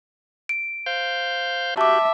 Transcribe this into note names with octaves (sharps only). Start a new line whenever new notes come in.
D7
C5 F5 G6
F#4 G4 E5 A5 D6